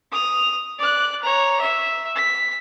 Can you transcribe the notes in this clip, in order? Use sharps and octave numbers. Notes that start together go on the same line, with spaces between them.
D#6 F7
D5 F#6
C#5 A#5
E5
B6